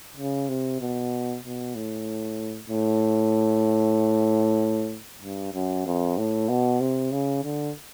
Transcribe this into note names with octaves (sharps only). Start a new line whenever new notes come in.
C#3
C3
B2
B2
A2
A2
G2
F#2
F2
A2
B2
C3
C#3
D3